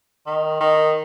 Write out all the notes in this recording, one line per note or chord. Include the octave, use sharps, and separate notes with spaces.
D#3
D#3